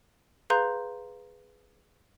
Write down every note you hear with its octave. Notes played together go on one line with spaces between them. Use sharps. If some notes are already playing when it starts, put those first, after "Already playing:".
G#4 B4 F5 A#5 C6 G6